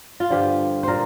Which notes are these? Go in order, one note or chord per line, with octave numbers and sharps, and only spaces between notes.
F4
G2 D3 F3 G4
A#2 A#4 C5